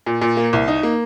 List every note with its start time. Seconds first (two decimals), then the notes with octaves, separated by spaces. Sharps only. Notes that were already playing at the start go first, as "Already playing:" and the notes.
0.06 A#2
0.21 A#2
0.37 A#3
0.53 C2
0.68 D#4
0.83 A#3